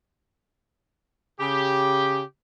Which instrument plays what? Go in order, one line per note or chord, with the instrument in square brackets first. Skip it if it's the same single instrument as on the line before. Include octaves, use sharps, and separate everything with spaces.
[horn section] C#3 G4